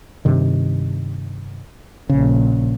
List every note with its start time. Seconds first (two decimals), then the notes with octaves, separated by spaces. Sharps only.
0.25 G2 C3 D#3
2.09 A#1 C#3